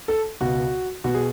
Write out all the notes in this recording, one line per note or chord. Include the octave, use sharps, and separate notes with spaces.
A4
C#2 B2 F#4
B2 F#4
G#4